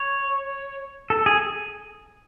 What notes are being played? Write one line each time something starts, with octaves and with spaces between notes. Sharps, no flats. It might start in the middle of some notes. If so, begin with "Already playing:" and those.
Already playing: C#5
A4
G#4